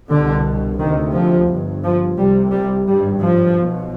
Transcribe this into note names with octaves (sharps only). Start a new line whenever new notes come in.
C2 B2 D3
D2 C3 D#3
F3
G1 G2
F3
C2 C3 G3
G3
G#1 G2 G3
F3
B1 B2